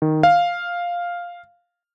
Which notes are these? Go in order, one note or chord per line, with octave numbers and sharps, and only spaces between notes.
D#3
F5